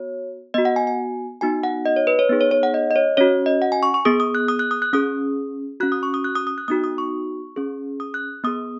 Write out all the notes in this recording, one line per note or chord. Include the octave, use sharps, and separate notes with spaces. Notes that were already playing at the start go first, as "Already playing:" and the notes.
Already playing: B3 F#4 C#5
B3 F#4 D#5
F#5
G#5
G#5
B3 D#4 F#4 G#5
F#5
D#5
C#5
B4
C#5
B3 D#4 G#4
C#5
C#5
F#5
D#5
D#5
C#5
C#4 F#4 C#5
D#5
F#5
G#5
C#6
C#6
B3 G#4 D#6
D#6
F#6
D#6
F#6
D#6
F#6
C#4 G#4 D#6
C#4 F#4 F#6
D#6
C#6
D#6
F#6
D#6
D#6
F#6
B3 D#4 F#4 D#6
D#6
C#6
C#4 G#4
D#6
F#6
B3 G#4 D#6